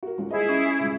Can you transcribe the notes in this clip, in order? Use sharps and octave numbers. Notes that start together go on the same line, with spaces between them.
F#4 A#4
D#1 C#4 F4
G#3 E4 G#4 C5 D#5
C#4
D#1 C#2